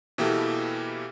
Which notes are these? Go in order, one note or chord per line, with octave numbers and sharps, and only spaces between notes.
B2 E3 A#3 E4 G4 A4